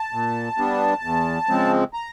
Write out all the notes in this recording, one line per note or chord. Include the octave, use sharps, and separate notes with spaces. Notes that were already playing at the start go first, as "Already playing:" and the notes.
Already playing: A5
A#2
G3 B3 D4
E2
C#3 F3 G#3 C4
A#5